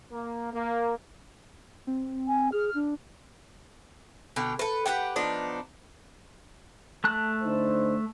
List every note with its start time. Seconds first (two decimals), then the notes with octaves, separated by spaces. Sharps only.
0.11 A#3
0.54 A#3
1.87 C4
2.28 G#5
2.52 G#4 F6
2.75 D4
4.36 B2 D3 G5
4.59 A4 B4
4.86 G4 B4 F#5 G5
5.16 F3 B3 D4 D#4
7.04 A3 A5 F#6
7.43 D3 D#4 C5